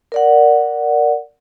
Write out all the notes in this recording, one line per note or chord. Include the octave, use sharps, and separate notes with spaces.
A#4 D5 F#5